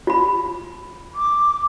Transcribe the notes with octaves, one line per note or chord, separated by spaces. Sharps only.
F4 B5
D6